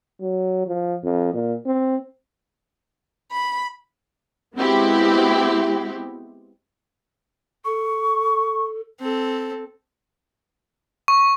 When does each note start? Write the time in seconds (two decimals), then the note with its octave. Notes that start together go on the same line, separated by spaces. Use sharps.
0.21 F#3
0.67 F3
1.04 F2
1.34 A#2
1.66 C4
3.32 B5
4.55 G#3 B3 C4 E4 F#4 G4
7.65 A4 C#6
9.00 C4 A4
11.08 C#6